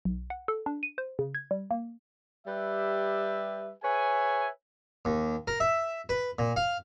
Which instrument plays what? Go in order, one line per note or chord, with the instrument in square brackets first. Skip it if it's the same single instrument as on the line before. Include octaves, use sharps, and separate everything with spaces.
[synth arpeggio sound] B1
F#5
A4
D4
D#7
C5
C#3
G#6
G3
A#3
[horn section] G3 G4 B4 E5
G#4 B4 C#5 E5 G#5
[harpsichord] D#2
A#4
E5
B4
A#2
F5